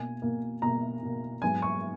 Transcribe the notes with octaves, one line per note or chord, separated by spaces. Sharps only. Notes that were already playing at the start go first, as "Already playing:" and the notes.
Already playing: B2 A#3 G#5
B2 A#3
B2 A#3 A#5
B2 A#3
G#2 F#3 B3 G#5
C#6